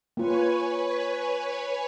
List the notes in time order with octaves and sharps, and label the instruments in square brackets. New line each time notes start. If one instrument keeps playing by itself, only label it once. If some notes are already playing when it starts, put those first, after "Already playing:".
[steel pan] A#3 F4 [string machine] B4 C#5 G#5